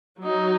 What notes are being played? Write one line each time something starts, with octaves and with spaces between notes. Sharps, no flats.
F#3 D#4